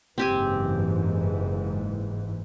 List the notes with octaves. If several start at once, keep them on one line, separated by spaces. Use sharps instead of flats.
F#1 G#2 E3 C4 G4 G#5